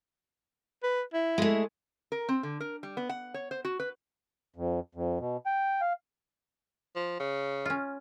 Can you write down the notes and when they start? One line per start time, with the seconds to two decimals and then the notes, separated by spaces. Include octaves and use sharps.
0.83 B4
1.14 E4
1.38 G#3 A3
2.12 A#4
2.29 C4
2.43 D3
2.60 A#4
2.83 G3
2.97 B3
3.09 F#5
3.34 C#5
3.51 C5
3.65 F#4
3.80 B4
4.56 F2
4.95 F2
5.20 B2
5.46 G5
5.81 F5
6.96 F3
7.20 C#3
7.65 C#4 F4